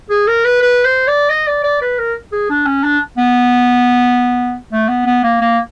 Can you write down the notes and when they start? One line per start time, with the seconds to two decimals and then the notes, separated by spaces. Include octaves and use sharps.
0.10 G#4
0.27 A#4
0.45 B4
0.62 B4
0.85 C5
1.07 D5
1.30 D#5
1.47 D5
1.64 D5
1.82 B4
1.99 A#4
2.32 G#4
2.50 D4
2.66 C#4
2.84 D4
3.18 B3
4.72 A3
4.88 B3
5.06 B3
5.23 A#3
5.41 A#3